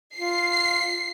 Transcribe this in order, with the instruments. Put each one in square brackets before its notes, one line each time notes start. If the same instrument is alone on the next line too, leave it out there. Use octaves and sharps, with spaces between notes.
[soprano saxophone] F4 [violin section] C7